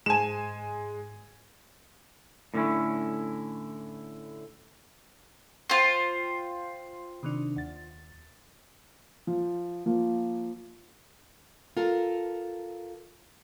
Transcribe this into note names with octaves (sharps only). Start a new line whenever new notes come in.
G#2 G#3 G#5 E7
A2 D3 B3 C#4 E4
F4 C5 F5 G5
C3 D#3 D4
D#2 A6
F3
F3 A#3
F4 A4 A#4